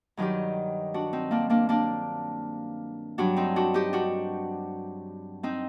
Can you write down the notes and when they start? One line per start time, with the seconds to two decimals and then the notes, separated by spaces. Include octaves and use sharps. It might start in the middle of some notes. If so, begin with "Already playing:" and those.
0.17 G2 D#3 F#3 D#4 G4
0.94 D4 F#4
1.13 C4 D#4
1.31 A#3 D4
1.50 A#3 D4
1.69 A#3 D4
3.18 G2 F#3 D4 F#4
3.37 C4 D#4
3.56 D4 F#4
3.74 D#4 G4
3.93 D4 F#4
5.43 C4 D#4